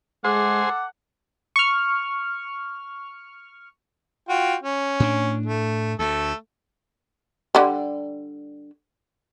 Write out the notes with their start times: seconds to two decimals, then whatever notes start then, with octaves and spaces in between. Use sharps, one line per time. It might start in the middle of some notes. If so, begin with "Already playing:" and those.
0.24 G#3 G#4 A4 C5 F#5 D6
1.56 C#6 F6
4.29 F4 F#4 G5
4.63 C#4
5.00 A2 D4
5.46 A3
5.99 D2 A3 A4
7.55 D3 G3